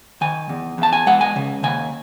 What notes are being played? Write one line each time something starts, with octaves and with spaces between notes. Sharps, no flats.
D#3 G#5
E2
E2 A5
G#5
G#3 F#5
G#5
C#3
D#2 G#5